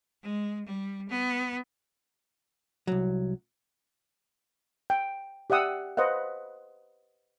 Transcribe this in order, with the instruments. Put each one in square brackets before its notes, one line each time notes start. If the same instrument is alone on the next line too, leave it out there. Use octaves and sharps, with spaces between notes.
[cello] G#3
G3
B3
[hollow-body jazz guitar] C2 F#3
[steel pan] G5
G4 D5 E5 F#5 D#6 E6
B4 C5 D#5 F5 F#5